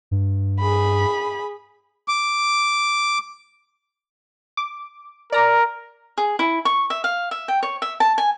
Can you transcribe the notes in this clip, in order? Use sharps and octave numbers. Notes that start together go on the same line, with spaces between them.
G2
G#4 B5
D6
D6
A#4 D5 A#5
G#4
E4
C#6
E5
F5
E5
G5
C#5
E5
A5
G#5